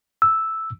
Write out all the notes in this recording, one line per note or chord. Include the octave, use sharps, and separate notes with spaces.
E6